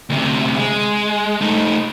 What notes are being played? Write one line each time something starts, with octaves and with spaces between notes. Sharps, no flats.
D2 C3
G#3
A3 D#4